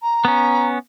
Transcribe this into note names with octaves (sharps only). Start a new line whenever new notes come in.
A#5
B3 C#4